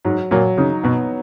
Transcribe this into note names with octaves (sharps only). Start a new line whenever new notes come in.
G#2 F#3
A#2 F#3
C#3 D#4
B2 B3